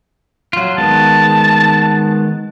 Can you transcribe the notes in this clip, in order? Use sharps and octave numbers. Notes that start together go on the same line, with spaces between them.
F#3 F4
D#3 G#3 B3 A5